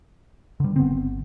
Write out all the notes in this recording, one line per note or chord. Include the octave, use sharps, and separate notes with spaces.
D3 G3
G1 B3 C4